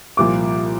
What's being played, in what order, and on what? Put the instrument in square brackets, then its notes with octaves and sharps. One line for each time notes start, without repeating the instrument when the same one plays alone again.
[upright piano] C2 A#2 F3 D6